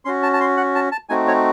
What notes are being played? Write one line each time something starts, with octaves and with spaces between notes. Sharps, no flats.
C#4 F#4 C6
A5
A5
C6
F#5
A5
A5
A3 C4 D#4 F#4 G#5
C#5